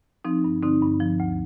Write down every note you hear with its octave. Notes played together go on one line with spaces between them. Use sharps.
F3 C4 D#4
G2
D3 C4 D#4
G2
F3
D2